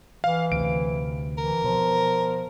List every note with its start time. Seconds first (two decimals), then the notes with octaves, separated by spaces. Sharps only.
0.24 E3 F5
0.52 D2 C3 D7
1.38 E3 A#4
1.64 B2 F3